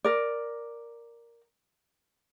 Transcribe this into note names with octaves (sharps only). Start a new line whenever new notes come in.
A#4 D5